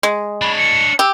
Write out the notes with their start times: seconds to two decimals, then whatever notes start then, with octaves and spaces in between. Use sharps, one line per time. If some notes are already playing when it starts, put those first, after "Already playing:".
0.03 G#3
0.42 D4 C#5 B5
0.58 C#7
0.99 G4 E6